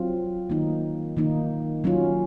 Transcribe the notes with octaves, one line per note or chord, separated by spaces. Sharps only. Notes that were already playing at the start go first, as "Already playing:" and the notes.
Already playing: F#3 C4 F4
D#3 A#3 D#4
D#3 A#3 D#4
F#3 C#4 F4